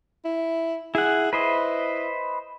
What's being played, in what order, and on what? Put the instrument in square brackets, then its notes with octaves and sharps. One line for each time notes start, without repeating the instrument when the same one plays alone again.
[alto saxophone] E4
[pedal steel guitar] E4 F#5 [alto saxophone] G#4
[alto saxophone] E4 [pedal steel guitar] B4 C5 D#5